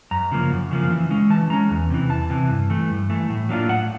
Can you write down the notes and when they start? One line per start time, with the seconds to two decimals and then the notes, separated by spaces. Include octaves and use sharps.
0.11 F#2 A#5
0.32 C#3 F3 A#3
0.51 F#2
0.71 C#3 F3 A#3
0.90 E3
1.11 G#3 C#4
1.30 E3 A5
1.50 G#3 C#4 A#5
1.70 E2
1.90 C3 E3
2.10 E2 A5
2.30 C3 E3
2.50 G2
2.70 E3 A3
2.90 G2
3.10 E3 A3
3.30 A2
3.49 F#3 A#3 D4 F4
3.69 A2 F#5